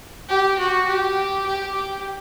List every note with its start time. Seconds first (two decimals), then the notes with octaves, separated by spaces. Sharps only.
0.29 G4
0.59 F#4
0.88 G4
1.46 G4
1.75 G4